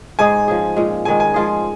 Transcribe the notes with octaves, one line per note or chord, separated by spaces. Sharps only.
G#2 G#3 D#4 G#4 G#5
F3 C#4 G#4
A#2 G#3 C#4
G#2 D#3 G#3 G#5
G#5
F3 G#3 F4 G#4